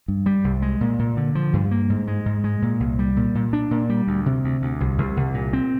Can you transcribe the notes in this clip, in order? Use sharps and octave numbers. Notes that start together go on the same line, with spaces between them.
G2
G3
C2
G#3
A#2
A#2
D3
F3
G2
A#3
G#2
G#3
G#2
G#3
A#2
C2
G3
A#2
A#2
D4
A#2
G3
D2
C3
D2
D2
C2
C2
C2
A#2
C4